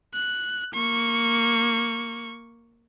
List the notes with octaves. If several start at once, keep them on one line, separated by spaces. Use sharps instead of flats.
F#6
A#3 C#6